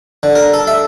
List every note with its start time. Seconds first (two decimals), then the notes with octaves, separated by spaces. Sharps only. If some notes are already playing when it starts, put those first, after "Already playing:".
0.23 D3
0.35 A#4
0.54 A4
0.67 E5